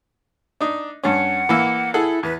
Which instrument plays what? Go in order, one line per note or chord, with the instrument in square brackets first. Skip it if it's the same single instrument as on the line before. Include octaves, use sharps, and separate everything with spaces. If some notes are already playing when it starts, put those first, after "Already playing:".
[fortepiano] D4 D#4
[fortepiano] G2 C#4 [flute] F#5
[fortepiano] E3 A#3 E6
[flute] E4 [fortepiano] G#4 A4 F#5
[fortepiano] E2 [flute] B4